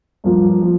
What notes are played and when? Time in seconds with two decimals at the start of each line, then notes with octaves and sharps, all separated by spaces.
0.24 G2 F3 A#3 F4
0.61 F3